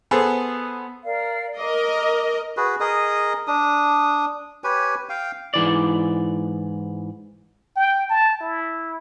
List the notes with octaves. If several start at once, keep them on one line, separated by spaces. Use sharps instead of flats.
B3 G#4 A4 C5
A#4 D5 F5
A#4 D#5 D6
F#4 G#4 B4
G#4 A#4 D#5 D#6
D4 D#6
G4 B4 C#5 G#5
F5 G5
G#2 E3 D5
G5
A5
E4